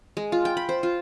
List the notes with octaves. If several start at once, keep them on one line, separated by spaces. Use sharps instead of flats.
G#3
F4
G5
B5
C5
F4